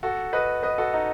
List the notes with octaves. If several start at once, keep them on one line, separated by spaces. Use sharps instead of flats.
F#4 A4
B4 D#5
B4 D#5
F#4 A4
D#4